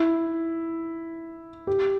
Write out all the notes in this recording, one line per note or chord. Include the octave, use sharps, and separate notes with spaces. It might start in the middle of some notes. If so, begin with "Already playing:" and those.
Already playing: E4
G4